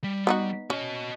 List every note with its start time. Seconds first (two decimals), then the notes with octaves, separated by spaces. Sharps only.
0.04 G3
0.27 B3 D#4 F#4
0.70 C#4 F#4 D#5